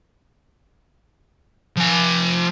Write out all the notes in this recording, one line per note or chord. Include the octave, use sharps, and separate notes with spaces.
F3 G#5